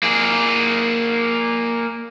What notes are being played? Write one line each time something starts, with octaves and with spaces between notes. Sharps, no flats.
A#3 G#4